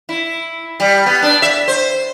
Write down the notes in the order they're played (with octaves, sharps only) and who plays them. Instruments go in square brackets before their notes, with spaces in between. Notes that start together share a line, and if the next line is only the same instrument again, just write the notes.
[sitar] E4
G3
B3
D4
E5
C5